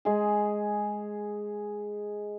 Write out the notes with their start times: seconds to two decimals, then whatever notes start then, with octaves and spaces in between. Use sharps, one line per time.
0.05 G#3 G#4